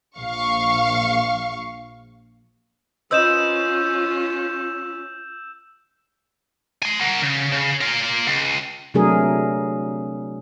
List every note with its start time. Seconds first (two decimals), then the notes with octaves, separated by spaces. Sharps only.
0.18 A#1 F5 C#6
3.11 C#4 F4 B4 C5 D#5 E6 G6 E7
6.83 G#5 C6
7.01 A#4 F#5
7.23 C#3
7.52 C#3
7.81 F4 A#4
8.27 C#2
8.94 C3 F#3 A3 D4 G#4 A#4